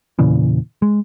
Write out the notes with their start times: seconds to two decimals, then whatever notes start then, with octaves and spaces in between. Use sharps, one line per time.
0.19 E2 A#2 C#3 E3
0.82 G#3